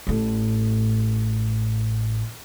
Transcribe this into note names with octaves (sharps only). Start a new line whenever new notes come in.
A1 A2